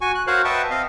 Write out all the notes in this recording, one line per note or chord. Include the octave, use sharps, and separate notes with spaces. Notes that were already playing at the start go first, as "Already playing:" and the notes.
F#4 G#5 C#6
F#6
F#4 A#4 C5 C#5 F5 F#6
B4 D#5 E5 F#5 G5 A5
C4 D#5 F5